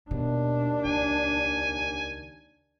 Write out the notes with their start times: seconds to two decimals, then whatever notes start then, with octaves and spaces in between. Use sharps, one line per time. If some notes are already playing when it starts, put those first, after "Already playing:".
0.11 D#2 B2 D4
0.85 C#2 G#5